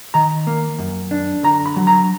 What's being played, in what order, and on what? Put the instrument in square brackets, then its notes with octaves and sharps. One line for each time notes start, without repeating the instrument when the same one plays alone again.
[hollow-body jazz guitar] D#3 A#5
A#3
F#2
D4
D3 A#5
B5
F#3
A#5